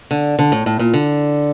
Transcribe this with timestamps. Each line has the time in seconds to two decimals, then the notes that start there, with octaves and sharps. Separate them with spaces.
0.11 D3
0.39 D3
0.52 A2
0.66 A2
0.79 A#2
0.94 D3